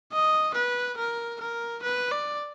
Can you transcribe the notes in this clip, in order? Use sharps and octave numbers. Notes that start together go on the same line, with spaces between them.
D#5
B4
A#4
A#4
B4
D5